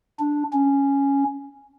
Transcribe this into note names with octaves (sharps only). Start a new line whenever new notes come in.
D4
C#4